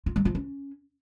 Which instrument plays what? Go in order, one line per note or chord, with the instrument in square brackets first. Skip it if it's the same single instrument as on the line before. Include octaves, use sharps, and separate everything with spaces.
[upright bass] F4
G3
F3
C#4